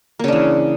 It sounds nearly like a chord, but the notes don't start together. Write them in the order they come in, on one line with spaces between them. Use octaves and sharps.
A#3 C#3 D4 E3